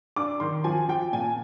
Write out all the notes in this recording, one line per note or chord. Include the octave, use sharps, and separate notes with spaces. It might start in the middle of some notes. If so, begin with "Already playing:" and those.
D4 D6
D#3 C6
F3 G#5
F3 G5
A#2 G#5